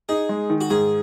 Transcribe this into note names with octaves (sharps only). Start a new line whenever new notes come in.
D#4 G#4
G#3
D#3
F#4
G#2 G#4